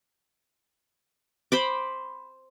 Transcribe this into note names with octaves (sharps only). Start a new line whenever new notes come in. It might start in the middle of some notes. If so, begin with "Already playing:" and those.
C5 B5 D6